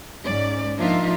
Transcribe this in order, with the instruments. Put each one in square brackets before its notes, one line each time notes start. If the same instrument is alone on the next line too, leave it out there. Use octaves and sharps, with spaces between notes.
[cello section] G#2 C#4 D5
F3 A#3 D4 D#4 F4 E5